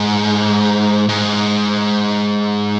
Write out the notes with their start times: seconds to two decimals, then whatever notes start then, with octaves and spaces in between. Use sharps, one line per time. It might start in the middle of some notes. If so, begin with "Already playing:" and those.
Already playing: G#2
1.09 G#2